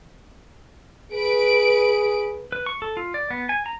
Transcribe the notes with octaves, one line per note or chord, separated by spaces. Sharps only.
G#4 B4 D7
B4
C#6
A4
F4
D5
B3
G#5
A#5